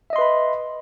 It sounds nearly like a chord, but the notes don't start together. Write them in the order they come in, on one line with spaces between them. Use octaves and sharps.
E5 D#5 C6 B4 B5